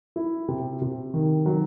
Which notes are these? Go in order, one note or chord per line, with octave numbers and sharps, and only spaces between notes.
E4
C3
C3
D#3
F#3